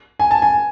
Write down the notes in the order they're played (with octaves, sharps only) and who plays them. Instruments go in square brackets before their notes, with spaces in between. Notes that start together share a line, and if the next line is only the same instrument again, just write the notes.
[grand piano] G#5
A5
G#5